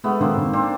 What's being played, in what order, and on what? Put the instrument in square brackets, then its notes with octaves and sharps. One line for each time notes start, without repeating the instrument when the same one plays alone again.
[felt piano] G#3 [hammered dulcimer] A3 B3
[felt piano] G#1 [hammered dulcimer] A#3 C4
[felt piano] G#1
[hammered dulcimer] C4 D4